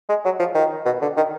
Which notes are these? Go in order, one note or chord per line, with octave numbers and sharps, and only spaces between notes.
G#3
F#3
F3
D#3
B2
D3
D#3